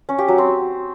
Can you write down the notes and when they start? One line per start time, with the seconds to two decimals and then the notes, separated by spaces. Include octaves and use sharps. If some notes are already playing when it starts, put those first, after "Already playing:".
0.09 C#4
0.18 G4
0.28 F#3
0.38 C4